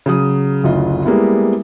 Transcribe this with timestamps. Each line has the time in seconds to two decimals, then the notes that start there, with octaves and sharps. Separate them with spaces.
0.06 C#3 F#3 D#6
0.64 F#1 D2 F4 D#5
1.05 G3 G#3 A#3 B3 E4